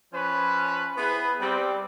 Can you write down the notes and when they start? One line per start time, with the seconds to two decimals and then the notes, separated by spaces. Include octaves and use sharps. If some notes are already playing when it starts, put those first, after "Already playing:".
0.13 F3 C#4 B4
0.97 B3 E4 G#4 B4
1.41 G3 C4